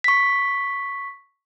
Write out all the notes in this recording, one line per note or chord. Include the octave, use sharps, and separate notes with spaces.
C#6 B6